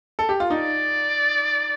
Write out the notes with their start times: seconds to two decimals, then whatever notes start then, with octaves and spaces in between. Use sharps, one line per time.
0.19 A4
0.29 G4
0.40 F4
0.50 D#4 D5